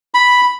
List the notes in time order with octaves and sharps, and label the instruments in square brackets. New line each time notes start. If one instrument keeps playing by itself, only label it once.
[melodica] B5